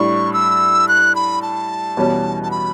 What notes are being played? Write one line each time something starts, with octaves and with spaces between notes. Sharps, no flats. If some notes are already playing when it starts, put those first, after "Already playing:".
Already playing: A2 G3 D4 C#6
E6
F#6
B5
A5
E2 B2 G3 C#4
A5
B5